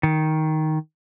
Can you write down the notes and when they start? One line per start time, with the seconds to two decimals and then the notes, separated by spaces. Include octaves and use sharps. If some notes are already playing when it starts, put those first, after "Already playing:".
0.03 D#3